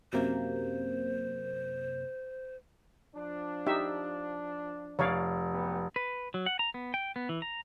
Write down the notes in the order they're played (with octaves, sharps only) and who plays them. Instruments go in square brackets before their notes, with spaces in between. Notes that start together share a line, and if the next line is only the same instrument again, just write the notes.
[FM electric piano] F#2 C3 A#3 [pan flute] C5
[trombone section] F3 D4
[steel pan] D#4 G4 E5
[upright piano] F1 [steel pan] C#5 D5 F5
[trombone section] F#3 B3 G4
[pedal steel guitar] B4
F#3
F#5
A#5
B3
G5
B3
E3
A#5